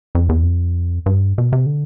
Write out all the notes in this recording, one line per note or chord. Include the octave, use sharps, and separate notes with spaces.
F2
E2
F2
G2
B2
C3
D3